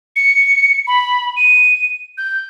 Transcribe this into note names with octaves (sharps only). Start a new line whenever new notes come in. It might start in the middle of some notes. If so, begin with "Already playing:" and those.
C#7
B5
D#7
G6